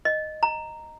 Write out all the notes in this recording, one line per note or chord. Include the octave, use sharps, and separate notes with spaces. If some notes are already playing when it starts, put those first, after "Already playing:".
D#5
A#5